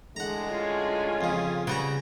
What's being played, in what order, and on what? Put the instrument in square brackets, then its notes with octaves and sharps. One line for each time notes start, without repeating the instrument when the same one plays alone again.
[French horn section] A2 D3 G#3 [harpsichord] F#5 A#5
[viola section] C#4 F4 G#5
[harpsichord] F2 C#3
[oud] C#3 G3 [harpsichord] B4 F#5 A#5